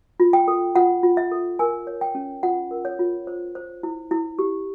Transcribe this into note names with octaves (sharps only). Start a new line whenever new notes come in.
F4
G5
A4
F4 F#5
F4
E5
A4
A#4 G#5
C#5
G5
C#4
F4 F#5
A#4
C#5
F4
C5
C5
E4
E4
G4